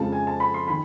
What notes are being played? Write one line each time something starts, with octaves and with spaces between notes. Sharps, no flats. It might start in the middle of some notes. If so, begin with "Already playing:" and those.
Already playing: F2 C#3 F3 G#3 A5
G#5
A5
B5
C6
D#3 B5